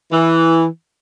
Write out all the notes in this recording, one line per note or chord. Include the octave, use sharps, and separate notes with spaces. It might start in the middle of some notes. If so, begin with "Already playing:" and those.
E3